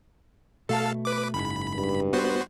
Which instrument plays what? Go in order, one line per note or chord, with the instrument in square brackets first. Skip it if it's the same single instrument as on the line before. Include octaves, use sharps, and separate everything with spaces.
[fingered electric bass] B2 A3 [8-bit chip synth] A4 F5 A5
[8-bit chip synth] B4 D6
[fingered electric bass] F#1 G#2 [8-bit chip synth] B5
[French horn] G2
[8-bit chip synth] B3 F#4 C5